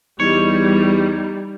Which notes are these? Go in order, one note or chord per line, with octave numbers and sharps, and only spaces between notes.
E2 G3 D#4 C#5